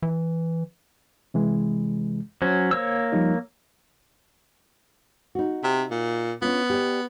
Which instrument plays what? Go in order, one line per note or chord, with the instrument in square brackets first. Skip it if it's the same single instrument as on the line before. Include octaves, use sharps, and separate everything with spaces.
[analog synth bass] E3
[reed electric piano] C3 E3 G#3
[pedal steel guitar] F#3 C#4 [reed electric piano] C5
[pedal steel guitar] A#3 C#5 E6
[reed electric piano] F3 G3 D#4
[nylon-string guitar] D#4 F#4
[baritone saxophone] C3
A#2
[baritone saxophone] B3 [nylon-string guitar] C#4 D4 F4
[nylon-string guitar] G4 D5